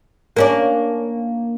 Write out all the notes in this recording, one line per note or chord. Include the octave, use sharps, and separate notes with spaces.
A#3 C#4 D4